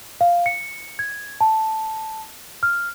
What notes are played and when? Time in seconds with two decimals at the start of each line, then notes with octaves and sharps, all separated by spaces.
0.21 F5
0.46 C#7
0.99 G#6
1.41 A5
2.63 F6